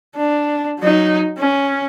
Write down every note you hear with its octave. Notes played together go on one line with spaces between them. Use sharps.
D4
F#3 D#4
C#4